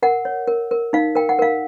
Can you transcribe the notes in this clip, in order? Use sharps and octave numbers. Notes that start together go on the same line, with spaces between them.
A#4 F#5
C#5
A#4
A#4
D#4 F5
A#4 G5
F#5
A#4 F5